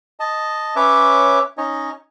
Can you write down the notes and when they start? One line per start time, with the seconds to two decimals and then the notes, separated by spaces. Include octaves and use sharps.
0.20 D#5 A5
0.76 C#4 B4 C#5 E5 D6
1.58 C#4 D#4 C#5 D#5